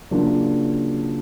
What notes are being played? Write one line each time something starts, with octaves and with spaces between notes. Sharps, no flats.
C#3 F#3 A#3 D4 F4